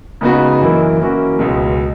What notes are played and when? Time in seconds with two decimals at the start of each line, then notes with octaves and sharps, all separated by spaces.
0.21 C#3 G#3 B3 D#4 F#4
0.60 F#2 E3 A#3 E4
1.00 E3 A#3 C#4 F#4
1.39 C#2 B2 G#3